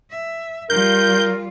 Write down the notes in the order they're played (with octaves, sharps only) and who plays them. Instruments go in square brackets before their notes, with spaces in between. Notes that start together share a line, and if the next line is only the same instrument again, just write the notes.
[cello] E5
[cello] G3 F4 [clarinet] A#4 [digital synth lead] G6